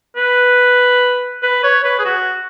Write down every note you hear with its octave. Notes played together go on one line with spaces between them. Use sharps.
B4
B4
C#5
B4
G#4
F#4